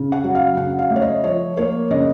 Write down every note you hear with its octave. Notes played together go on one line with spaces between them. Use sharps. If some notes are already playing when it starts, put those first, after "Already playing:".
Already playing: C#3
F#5
F#3
F5
C#3 F#5
F5
A3
C#5
D#5
F3 C#5
A#3 C#5
C#3 D#5